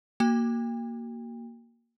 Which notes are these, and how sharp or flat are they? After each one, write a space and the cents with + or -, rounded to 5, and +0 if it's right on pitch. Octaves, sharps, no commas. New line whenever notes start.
A#3 +0 F#4 +25 G5 +40